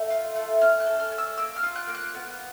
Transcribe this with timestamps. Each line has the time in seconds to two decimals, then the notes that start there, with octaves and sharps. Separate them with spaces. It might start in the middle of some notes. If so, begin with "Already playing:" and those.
Already playing: A3
0.10 F4
0.35 A3
0.61 C#4 F6
0.80 F#6
0.86 A4
1.00 F6
1.12 C#4
1.18 E6
1.38 A#3 E6
1.56 F6
1.63 F4
1.75 F#6
1.88 A#3
1.95 F#6
2.15 B3